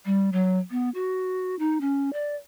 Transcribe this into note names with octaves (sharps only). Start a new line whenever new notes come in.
G3
F#3
B3
F#4
D#4
C#4
D5